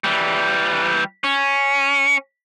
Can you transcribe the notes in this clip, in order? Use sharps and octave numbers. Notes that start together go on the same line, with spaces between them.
E3 G3
C#4